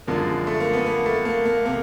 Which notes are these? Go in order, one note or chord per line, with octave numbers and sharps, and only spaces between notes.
F#2 D3 F3 G#3 A#3
A3
A#3
B3
A#3
A3
A#3
A#3
C3 A#3